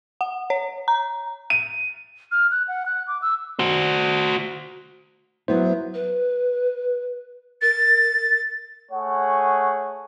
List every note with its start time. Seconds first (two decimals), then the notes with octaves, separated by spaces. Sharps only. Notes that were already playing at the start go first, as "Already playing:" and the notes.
0.21 F#5
0.50 C#5
0.88 A#5
1.50 D#7
2.32 F6
2.51 F#6
2.68 F#5
2.86 F#6
3.08 D6
3.22 E6
3.59 F#4 C5
5.48 F#3 B3 E4 C5
5.94 B4
7.62 A#4 A6
8.92 A3 G#4 C#5 F#5